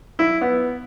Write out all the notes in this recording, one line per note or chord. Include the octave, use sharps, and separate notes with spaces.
E4
B3